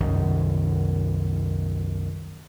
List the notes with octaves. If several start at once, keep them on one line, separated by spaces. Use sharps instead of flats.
C2 F#2 D#3